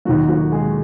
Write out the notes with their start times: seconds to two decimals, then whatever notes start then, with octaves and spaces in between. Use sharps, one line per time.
0.05 D#2 D#3 F#3 F#4
0.28 F#3 F#4
0.52 G#3 G#4